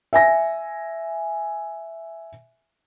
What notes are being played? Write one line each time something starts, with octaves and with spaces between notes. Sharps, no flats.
E5 G#5 A#6